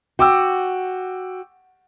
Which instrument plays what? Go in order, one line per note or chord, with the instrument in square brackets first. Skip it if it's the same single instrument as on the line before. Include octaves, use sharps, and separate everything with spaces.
[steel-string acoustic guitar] F#4 [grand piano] G5 D6 E6